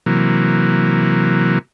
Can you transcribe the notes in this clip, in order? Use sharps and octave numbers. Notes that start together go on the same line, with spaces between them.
C3 E3 F#3 A#3